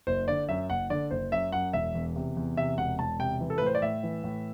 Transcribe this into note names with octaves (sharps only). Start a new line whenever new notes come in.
F#1 C5
D3 D5
F#2 E5
F#1 F#5
D3 D5
F#1 C5
F#2 E5
F#2 F#5
E1 E5
E2
C3
E2
C3 E5
E1 F#5
E1 A5
C3 G5
E3
A4
B4
A2
C5
D5
A2 E5
E3
A2